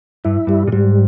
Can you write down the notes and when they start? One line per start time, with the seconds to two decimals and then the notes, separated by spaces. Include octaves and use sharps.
0.25 G2 E4
0.47 G2 G3
0.68 A#2
0.72 G#2 G3